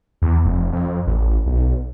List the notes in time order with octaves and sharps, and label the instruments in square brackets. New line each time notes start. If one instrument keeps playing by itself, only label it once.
[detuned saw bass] E2
F1
F2
A1
B1